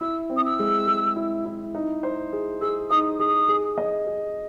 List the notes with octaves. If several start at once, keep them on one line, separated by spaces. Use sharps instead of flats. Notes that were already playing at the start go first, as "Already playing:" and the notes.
E4 E6
C4
D#6
E6
G#3
G#3
E4
E4
D#4
C5
G#4
G#4 E6
D#4 D#6
G#4 D#6
G#4
D#5
G#4